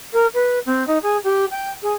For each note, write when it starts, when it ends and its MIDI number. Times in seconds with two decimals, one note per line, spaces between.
0.13 0.26 70
0.34 0.59 71
0.66 0.86 60
0.87 0.98 63
1.03 1.17 68
1.24 1.45 67
1.51 1.70 79
1.82 1.93 68